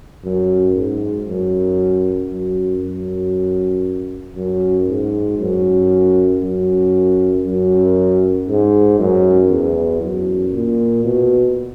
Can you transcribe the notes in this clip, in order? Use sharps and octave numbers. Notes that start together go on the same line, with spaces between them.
F#2
G#2
F#2
F#2
F#2
F#2
G#2
F#2
F#2
F#2
G#2
F#2
E2
F#2
A#2
B2